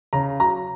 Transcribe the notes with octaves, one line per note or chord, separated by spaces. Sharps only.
C#3 A#5
F#3 A#5